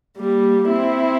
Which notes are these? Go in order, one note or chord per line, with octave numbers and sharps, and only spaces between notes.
G3 A#3
C4 E4